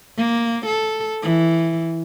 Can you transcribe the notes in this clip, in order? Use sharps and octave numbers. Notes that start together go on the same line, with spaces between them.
A#3
A4
E3